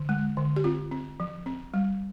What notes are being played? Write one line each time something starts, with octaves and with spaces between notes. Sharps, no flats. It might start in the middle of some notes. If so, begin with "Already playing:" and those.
Already playing: D3
G#3
D3
G4
C4 F4
C4
F3
C4
G3